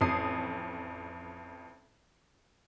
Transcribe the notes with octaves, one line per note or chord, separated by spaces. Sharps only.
A1 F2 A5 D#6 C7